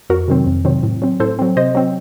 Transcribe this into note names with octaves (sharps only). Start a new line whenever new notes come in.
F2 F#4 A#4
C3 D#3 F#3 C4
F2
C3 D#3 F#3 C4
A2
F#3 C4
A2 A4 C5
F#3 C4
C3 C5 D#5
F#3 C4